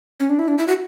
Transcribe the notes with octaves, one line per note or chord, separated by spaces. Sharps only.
C#4
D4
E4
D4
E4
F#4